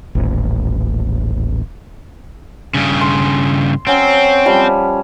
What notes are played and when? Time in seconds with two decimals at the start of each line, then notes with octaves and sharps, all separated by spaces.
0.15 D#1 A1
2.74 G2 C#3
3.01 C6
3.87 F#3 C4 C#4
4.46 F3 G3